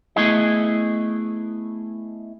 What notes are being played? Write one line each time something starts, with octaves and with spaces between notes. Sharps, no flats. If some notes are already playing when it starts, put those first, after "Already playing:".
A3 B3 E4 G#4 D#5